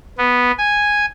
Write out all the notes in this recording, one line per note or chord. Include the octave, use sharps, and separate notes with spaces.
B3
G#5